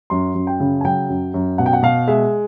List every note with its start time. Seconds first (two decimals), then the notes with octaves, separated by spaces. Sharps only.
0.10 F#2 C6
0.35 F#2
0.47 G5
0.60 C#3
0.81 G#5
0.85 F#3 G5
1.09 F#2
1.34 F#2
1.58 B2 F#5
1.66 G5
1.73 F#5
1.83 B2 F5
2.07 G#3 E5